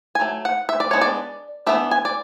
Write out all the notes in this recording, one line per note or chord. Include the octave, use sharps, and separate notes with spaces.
G#5
F#3 A3
F#5
E5
D5
G#3 B3 D4 C#5
D5
E3 B3 D4 E5
G#5
D5